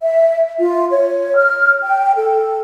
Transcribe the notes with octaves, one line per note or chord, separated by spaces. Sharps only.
E5
F4
C#5
F6
G5
A4